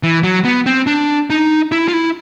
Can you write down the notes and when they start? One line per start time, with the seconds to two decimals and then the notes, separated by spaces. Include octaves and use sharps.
0.03 E3
0.23 F#3
0.44 B3
0.66 C4
0.87 D4
1.30 D#4
1.72 E4
1.88 F4
1.94 E4